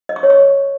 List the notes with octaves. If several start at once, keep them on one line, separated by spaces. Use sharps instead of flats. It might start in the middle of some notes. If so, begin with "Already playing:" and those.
D#5
C#6
C#5
C#6